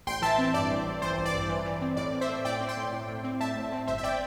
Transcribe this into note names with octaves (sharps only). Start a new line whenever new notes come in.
A1 G5 C6
E3 E5 A5
C4
G2 D5
A1
A1
E3 C5
A1
D5
G2
E3
E3
C4
A2 D5
C4
C5 E5
A3
A2 D5 G5
C4
G5 C6
A2
A2
A2
C4
A2 E5 A5
A2
C4
G1 C5 E5
E5
D5 G5